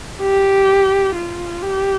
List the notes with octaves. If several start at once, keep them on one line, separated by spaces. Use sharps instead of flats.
G4
F4
G4